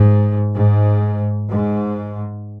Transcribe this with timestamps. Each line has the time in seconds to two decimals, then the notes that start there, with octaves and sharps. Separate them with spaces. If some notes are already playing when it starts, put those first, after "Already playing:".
Already playing: G#2
0.54 G#2
1.51 G#2